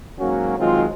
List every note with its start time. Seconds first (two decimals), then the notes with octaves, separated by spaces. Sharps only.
0.19 G#2 F#3 A#3 C#4 F#4
0.58 D#3 F#3 G#3 C4 F4